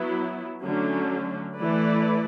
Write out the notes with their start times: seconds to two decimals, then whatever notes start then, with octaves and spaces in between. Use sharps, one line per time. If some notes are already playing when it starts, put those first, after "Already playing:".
Already playing: F#3 B3 E4
0.62 D3 F#3 A3 C#4
1.57 E3 A3 E4 B4 D5